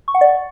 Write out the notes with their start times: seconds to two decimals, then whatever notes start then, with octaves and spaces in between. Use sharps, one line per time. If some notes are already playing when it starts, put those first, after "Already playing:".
0.08 C#6
0.14 F#5
0.21 D5